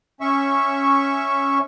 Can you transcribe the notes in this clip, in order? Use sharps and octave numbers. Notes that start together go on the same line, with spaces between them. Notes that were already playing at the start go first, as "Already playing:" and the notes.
C#4 E5 C#6